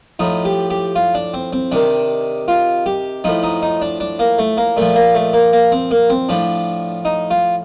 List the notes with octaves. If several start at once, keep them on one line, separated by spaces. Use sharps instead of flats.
A2 F3 D#4
G4
G4
F4
D4
C4
C4
C3 D#3 D4
F4
G4
A2 F3 D#4
D#4
D#4
D4
D4
A#3
A3
A#3
A#2 F3 A3
A#3
A3
A#3
A#3
C4
A#3
C4
A2 F3 D4
D#4
F4